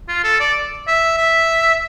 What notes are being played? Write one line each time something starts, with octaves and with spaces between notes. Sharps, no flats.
F4
A4
D5
E5
E5